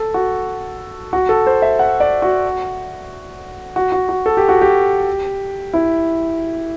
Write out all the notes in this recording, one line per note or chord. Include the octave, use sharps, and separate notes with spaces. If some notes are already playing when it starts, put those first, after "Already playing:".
Already playing: A4
F#4
F#4
A4
C5
E5
F#5
D5
F#4
F#4
F#4
F#4
A4
G4
F#4
G4
E4